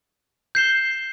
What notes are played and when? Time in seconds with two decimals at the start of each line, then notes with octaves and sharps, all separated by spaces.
0.55 G6 C7 E7 G7